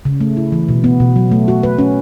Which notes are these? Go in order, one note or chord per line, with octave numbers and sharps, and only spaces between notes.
C#3
A3
E4
E3
B2
B3
B2
F#3
A3
F#4
B4
C#4